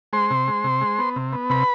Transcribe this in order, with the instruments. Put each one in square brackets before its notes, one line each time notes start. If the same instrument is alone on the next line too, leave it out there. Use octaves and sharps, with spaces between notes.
[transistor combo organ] G#3 C5 C6
C3
G#3
C3
G#3
B3
C3
B3
C3 B4 B5